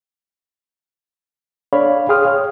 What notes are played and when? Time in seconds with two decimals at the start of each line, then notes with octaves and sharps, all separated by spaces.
1.73 D4 A4 C#5 D5 F5 B5
2.09 G#4 F5 G5 C6 D#6 F6
2.25 C#5 F6